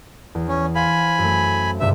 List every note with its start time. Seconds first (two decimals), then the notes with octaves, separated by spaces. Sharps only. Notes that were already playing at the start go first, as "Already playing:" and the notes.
0.35 E2
0.49 C#4
0.75 C5 F5 G#5 B5
1.19 F#2 A3
1.80 C#2 G2 C3 E5